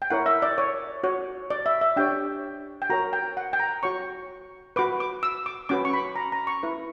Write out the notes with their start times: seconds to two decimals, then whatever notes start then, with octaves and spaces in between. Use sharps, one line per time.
0.02 G5
0.10 E4 A#4 C#5 F#5
0.26 E5
0.42 D5
0.58 C#5
1.04 F#4 C#5
1.50 D5
1.66 E5
1.81 E5
1.96 D4 G4 C#5 G5
2.82 G5
2.90 F#4 A#4 C#5 A#5
3.13 G5
3.37 F#5
3.53 G5
3.60 A#5
3.83 F#4 C#5 C#6
4.76 F#4 B4 D6
5.00 D6
5.23 E6
5.46 D6
5.69 C#4 F#4 B4 D6
5.85 C#6
5.93 B5
6.16 A#5
6.32 A#5
6.47 C#6
6.63 E4 B4